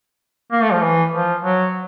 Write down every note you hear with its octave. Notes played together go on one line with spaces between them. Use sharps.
A#3
A3
F3
E3
F3
F#3